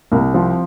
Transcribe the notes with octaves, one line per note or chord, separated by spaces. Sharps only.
C2 A#3
F3 C4